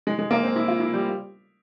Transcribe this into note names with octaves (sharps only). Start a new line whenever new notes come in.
G#3
G#3
A#3
C4
E4
F4
E4
G3